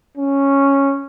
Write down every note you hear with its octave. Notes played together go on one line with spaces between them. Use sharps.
C#4